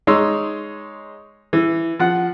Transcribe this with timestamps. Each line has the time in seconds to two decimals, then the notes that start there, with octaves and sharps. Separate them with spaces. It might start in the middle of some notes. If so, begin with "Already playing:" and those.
0.07 G#3 D#4 C#5 C6 E6
1.53 E3
1.99 F3 F#5